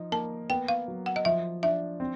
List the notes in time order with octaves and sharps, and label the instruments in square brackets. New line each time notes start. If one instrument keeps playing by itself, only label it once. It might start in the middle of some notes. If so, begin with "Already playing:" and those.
Already playing: [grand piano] F3 D#4
[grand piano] A#3 [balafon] A5
[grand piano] B3 [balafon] G5
[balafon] F5
[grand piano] F#3
[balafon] F#5
D#5
[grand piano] F3 [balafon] E5
[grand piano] D4 [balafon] E5
[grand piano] C4